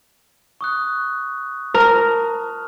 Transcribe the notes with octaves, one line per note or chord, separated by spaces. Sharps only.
C#6 D#6 F#6
A#4 A5